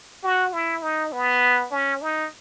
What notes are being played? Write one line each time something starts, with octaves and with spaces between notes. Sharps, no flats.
F#4
E4
D#4
B3
C#4
D#4